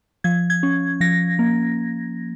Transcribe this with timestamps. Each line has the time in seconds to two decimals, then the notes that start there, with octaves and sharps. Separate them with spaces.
0.24 F3 G#6
0.50 G#6
0.63 C#4
1.00 F3 A#6
1.39 A#3